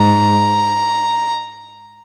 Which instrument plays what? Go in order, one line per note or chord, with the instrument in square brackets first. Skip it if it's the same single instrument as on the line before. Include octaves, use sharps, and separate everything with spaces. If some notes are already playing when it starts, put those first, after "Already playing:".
Already playing: [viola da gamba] G#2 [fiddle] A#5